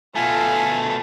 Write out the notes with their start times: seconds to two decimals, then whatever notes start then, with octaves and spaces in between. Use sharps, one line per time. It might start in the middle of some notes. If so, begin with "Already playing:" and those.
0.15 B2 A3 F4 A4 G#5